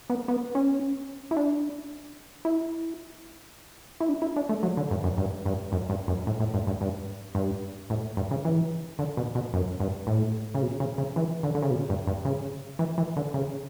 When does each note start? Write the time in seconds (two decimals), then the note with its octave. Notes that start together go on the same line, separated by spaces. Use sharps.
0.10 B3
0.28 B3
0.55 C#4
1.31 E4
1.37 D4
2.45 E4
4.00 E4
4.09 D4
4.22 E4
4.36 D4
4.49 A3
4.63 F#3
4.77 D3
4.91 G2
5.04 F#2
5.17 G2
5.45 G2
5.72 F#2
5.90 G2
6.08 F#2
6.27 A2
6.40 A2
6.54 G2
6.67 G2
6.81 G2
7.35 G2
7.90 A2
8.17 G2
8.31 C#3
8.45 E3
8.99 D3
9.17 B2
9.35 B2
9.53 F#2
9.80 G2
10.07 A2
10.55 C#3
10.62 B2
10.80 C#3
10.98 C#3
11.16 E3
11.43 D3
11.55 D3
11.62 C#3
11.70 B2
11.89 G2
12.07 G2
12.25 C#3
12.79 E3
12.98 E3
13.16 D3
13.34 C#3